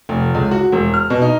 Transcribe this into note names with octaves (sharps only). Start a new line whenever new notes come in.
F1
C#2
F#4
E1
F6
B2
D#4